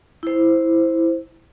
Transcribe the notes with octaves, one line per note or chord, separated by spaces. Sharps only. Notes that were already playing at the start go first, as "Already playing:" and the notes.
E4 C5